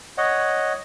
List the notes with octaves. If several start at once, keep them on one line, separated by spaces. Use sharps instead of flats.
C#5 D#5 F#5